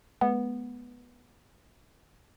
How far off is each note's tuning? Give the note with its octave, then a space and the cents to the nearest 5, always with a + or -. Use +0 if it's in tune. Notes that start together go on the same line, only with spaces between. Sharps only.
G#3 +35 B3 -10